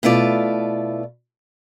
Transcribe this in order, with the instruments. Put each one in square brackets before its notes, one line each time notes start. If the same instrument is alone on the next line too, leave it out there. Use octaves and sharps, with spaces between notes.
[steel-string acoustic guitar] B2 A3 E4 F4 D5